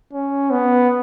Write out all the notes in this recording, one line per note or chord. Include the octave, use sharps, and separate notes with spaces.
C#4
B3